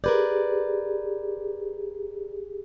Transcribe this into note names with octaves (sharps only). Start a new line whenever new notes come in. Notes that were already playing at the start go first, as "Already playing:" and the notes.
G4 G#4 A#4 B4 D5